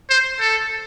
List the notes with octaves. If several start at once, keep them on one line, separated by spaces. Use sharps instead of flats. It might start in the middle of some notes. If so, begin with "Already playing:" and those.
C5
A4